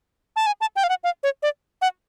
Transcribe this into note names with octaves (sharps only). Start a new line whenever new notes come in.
A5
G#5
A5
G5
F5
F#5
F5
C#5
D5
F#5